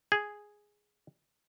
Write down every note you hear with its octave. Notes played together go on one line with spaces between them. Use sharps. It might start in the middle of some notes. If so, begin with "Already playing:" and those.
G#4